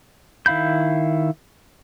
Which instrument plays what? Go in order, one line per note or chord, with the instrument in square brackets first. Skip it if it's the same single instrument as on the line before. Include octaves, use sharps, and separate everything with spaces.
[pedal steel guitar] D#3 E4 F5 B5 G6